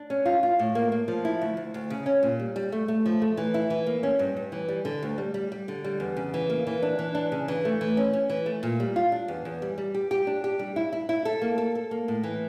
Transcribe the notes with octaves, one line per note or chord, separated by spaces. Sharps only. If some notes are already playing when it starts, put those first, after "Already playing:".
Already playing: D4
C#4
F4
F4
A2
A#3
A#3
F3
E4
D2
D2
D2
C#3
C#4
A#2
G3
G3
A3
A3
F3
A3
E3
E4
E3
A#3
C#4
G2
G2
E3
G3
D3
D2
G3
G3
G3
D3
G3
E2
C#3
E3
A#3
E3
D4
E3
D4
C#3
E3
A3
E3
C#4
C#4
E3
A3
A#2
G3
F4
D4
E2
E2
G3
G3
G4
G4
D4
G4
G3
E4
E4
E4
A4
A#3
A4
A4
A#3
A2
E3